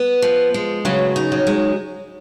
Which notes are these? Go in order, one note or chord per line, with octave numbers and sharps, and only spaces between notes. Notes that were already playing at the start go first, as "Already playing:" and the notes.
Already playing: B3
F3
G#3
C#3 F#3
D#4
F#3
G#3